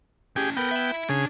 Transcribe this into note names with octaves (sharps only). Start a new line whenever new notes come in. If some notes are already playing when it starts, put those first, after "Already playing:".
C#4 E4 G4 G#4
B3 A4 A#4 G5
E5 B5
C#3 D4 G#4